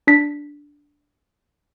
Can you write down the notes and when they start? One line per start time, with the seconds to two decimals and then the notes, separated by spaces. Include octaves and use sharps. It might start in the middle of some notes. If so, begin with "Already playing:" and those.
0.07 D4 B6